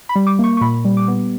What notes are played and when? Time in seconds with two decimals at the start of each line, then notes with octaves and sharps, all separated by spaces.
0.09 B5
0.15 G3
0.27 D6
0.39 A#3 C#6
0.57 C#6
0.61 A#2 B5
0.85 G3
0.97 D6
1.08 B3